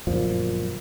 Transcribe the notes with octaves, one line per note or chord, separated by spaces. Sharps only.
G1 F#2 A#2 F3